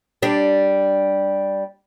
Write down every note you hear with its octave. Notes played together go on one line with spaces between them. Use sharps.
G3 D4